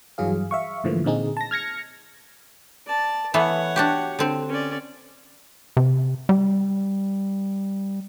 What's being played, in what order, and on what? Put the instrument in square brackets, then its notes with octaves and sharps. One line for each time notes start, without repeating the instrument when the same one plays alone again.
[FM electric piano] G2 E3 F#3 G#4 F5
E5 F5 C#6
G#2 D3 E3 F3 A3 A#3
A#2 D3 C4 D#4 G#4
A5 A#6
F6 G#6 A#6 C#7
[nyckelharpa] D5 A5
[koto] E3 A3 B3 [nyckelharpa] C#5 F#5
[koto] D4 F#4 G4
D3 C4
[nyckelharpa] C#4 D5
[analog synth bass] C3
G3